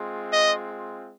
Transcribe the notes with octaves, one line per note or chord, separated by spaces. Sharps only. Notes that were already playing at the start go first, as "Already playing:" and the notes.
Already playing: G#3 C4 F4
D#5